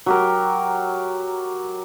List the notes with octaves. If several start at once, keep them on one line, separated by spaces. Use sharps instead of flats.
F#3 G4 A#4